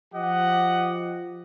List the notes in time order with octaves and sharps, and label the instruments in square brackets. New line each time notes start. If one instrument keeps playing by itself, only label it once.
[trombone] F3 [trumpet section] G4 D#5 F#5